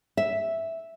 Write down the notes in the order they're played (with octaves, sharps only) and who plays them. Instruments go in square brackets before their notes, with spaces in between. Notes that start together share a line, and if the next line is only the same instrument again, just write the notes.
[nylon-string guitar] E5